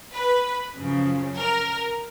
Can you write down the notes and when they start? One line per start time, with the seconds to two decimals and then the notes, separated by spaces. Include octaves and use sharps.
0.14 B4
0.77 F#2 C#3 F3
1.38 A#4